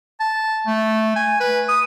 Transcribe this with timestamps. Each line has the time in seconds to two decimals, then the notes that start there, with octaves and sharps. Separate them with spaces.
0.20 A5
0.67 A3
1.16 G#5
1.40 B4
1.69 D#6